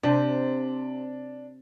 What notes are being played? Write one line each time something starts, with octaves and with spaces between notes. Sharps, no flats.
C3 D4